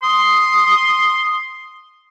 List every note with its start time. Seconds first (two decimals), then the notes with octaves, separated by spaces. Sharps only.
0.03 C6 D#6